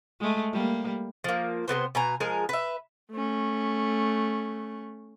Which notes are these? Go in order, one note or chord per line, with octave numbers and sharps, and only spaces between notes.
G#3 A3
G3 A#3
F3 A#3
C3 G3 B3 C5
B2 G#5 A#5
F3 G#3 G#4 A#4
B4 E5
A3 C#4